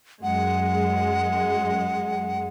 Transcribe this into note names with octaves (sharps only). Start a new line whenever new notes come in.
F#2 G#3 F#5